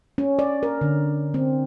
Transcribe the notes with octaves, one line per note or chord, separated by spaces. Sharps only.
C#4
D5
A#4
D3
C4